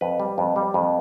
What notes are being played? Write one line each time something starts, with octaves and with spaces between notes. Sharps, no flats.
F2 B4
G3
F2
G3
F2